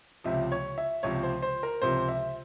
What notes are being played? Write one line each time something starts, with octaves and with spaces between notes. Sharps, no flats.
C#2 C3 F3 E5
C#5
E5
C#2 C3 F3 C#5
C5
C5
A#4
C#2 C3 F3 C5
E5